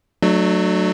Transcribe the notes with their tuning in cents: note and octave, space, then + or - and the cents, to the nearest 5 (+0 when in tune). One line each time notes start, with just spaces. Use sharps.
F#3 +0 A3 +0 D4 +40